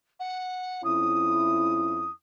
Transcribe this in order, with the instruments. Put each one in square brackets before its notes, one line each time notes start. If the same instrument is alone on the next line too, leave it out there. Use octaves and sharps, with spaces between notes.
[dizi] F#5
[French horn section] F2 C#4 E4 [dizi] D#6